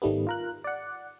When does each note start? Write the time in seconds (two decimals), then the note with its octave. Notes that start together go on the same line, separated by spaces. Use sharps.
0.02 G#1 D#3 G3 A3 B3
0.27 F4 A#4 F#6
0.64 D5 F#5